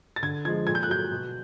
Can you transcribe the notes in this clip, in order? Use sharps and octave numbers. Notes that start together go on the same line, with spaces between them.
A6
D3 G#6
F3 G#3 G#6
A#2 G#6
G6
F#6
F#3 G6
B2